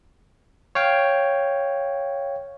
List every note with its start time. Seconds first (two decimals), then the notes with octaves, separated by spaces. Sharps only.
0.75 C#5 F5 G5